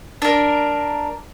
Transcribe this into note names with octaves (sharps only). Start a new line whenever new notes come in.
D4 A#4